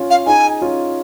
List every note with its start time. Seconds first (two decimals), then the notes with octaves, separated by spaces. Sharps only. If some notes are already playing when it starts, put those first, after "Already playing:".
Already playing: C#4 F4
0.10 F5
0.27 D#4 G#4 G#5
0.62 C#4 F4